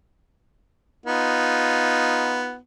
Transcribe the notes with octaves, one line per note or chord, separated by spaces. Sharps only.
B3 D#4 F4